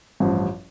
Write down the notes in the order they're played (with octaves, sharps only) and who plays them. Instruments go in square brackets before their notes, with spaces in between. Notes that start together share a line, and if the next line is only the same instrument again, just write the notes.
[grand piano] A1 G2 F3